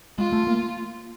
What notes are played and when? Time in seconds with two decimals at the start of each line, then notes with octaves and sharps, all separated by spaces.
0.18 G#3 F4
0.32 A3
0.47 A#3